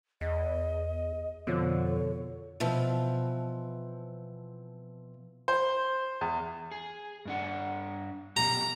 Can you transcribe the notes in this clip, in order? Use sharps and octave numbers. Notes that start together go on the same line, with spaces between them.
E2 D#5
F2 B2 D3 F3 C#5
B2 E3 F3 C4
C5
E2
G#4
G2 D4 F#5
F#3 B3 G4 A#5